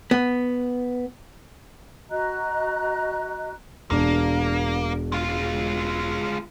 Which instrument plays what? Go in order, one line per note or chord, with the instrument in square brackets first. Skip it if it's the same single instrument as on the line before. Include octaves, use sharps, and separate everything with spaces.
[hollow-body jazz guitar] B3
[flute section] F#4 D#5 A#5 F#6
[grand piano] E1 D4 [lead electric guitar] A#3
[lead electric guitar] G#3 F4